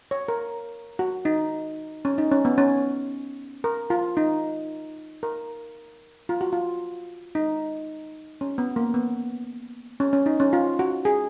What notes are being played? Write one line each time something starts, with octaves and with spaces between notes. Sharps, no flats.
C#5
A#4
F#4
D#4
C#4
D#4
C#4
B3
C#4
A#4
F4
D#4
A#4
F4
F#4
F4
D#4
C#4
B3
A#3
B3
C#4
C#4
D#4
C#4
F4
F#4
G#4